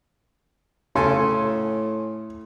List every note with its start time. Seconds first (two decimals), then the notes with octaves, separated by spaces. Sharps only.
0.96 A2 C#3 A4 G#5 C6